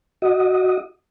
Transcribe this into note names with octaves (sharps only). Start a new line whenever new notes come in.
F#4 D#5